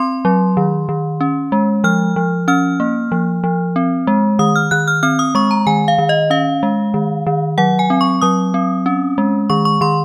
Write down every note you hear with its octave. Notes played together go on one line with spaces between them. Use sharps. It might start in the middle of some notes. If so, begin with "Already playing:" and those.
Already playing: C4 C6
F#3
D#3
D#3
C#4
G#3
F3 F6
F3
C#4 F6
A#3
F3
F3
C4
G#3
D#3 D#6
F6
D#3 F#6
F6
C4 F6
D#6
G#3 C#6
A#5
D#3 G#5
F5
D#3
D#5
C#4 F5
G#3
D#3
D#3
F#3 F#5
G#5
C4
C#6
F#3 D#6
C4
C#4
G#3
D#3 C#6
C#6
D#3 C6